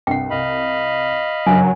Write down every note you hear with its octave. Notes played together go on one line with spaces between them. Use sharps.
C2 G2 F#5 G5
C2 D#5 F5 B5
F#1 G2 F#3 G#5